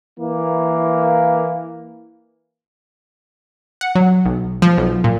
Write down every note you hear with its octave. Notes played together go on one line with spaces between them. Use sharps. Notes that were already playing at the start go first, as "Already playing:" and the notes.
E3 A#3
F#5
F#3
B1
F3
B1
A#2